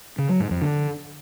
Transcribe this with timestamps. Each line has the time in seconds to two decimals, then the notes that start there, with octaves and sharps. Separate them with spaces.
0.18 C#3
0.29 F#3
0.40 G#2
0.51 F2
0.62 D3